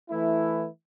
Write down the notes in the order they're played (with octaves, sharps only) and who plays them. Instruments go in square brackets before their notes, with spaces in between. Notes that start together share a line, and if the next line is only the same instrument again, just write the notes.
[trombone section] E3 A3 E4